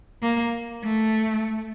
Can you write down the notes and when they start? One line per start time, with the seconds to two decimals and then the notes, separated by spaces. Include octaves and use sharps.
0.22 A#3
0.84 A3